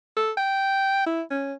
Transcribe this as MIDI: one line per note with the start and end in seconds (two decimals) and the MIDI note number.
0.16 0.32 69
0.37 1.02 79
1.06 1.22 64
1.31 1.53 61